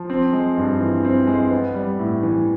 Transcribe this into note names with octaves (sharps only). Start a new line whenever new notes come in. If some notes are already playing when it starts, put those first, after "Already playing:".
Already playing: F3
C4
G#3
G2
E3
C4
G#3
B3
G3
A2
E3